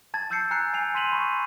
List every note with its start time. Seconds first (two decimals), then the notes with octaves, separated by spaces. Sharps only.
0.14 A5 G#6 A6
0.30 A5 E6 G6 G#6 C7 C#7
0.51 G#5 A#5 F#6 C7 C#7
0.74 G#5 C7 F7
0.95 C6 B6 D#7 F7 F#7
1.12 B5 C#6